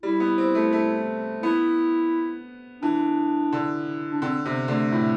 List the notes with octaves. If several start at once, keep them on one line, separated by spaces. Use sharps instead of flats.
G3 E4
B3
C4
A3
A3
B3 E4
E3 D4
D3
D4
D3 C4
C3 B3
D3 A3
A2